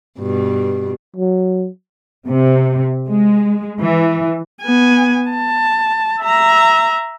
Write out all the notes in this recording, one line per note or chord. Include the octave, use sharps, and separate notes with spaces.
G2 B2
F#3
C3
G#3
E3
B3 G#5
A5
E5 A#5